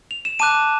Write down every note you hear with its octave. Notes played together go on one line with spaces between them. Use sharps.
F7
E7
A5 D6 F#6 D#7